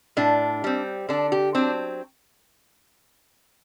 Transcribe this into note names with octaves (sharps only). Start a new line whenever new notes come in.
A2 D4
G3 C4
D3 D4
G4
F#3 C4 D4